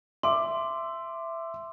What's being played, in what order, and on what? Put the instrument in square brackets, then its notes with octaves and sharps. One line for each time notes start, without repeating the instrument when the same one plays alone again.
[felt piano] E5 D6 [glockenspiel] C6